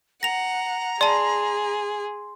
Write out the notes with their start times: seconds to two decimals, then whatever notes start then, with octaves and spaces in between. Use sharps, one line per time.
0.23 F#5 A#5 A#6 F7
1.01 G#4 D5 A5 C6